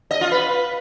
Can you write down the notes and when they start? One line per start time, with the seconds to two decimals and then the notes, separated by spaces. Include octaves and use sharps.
0.11 D#5
0.21 F4
0.32 B4